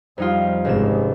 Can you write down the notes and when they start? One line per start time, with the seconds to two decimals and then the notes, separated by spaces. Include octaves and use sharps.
0.18 F2 G3 D#4 F4
0.65 G#1 C#2 G#2 C3 E7